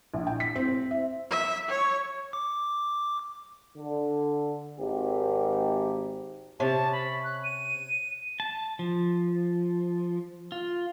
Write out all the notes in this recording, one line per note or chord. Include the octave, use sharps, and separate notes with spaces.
A#1
G5
B6
C4
C4
E5
E5
C#5
D6
D3
G#1 G4
C3 C#4 C#5 A5
B5
F#6
D#7
A5
F3
F4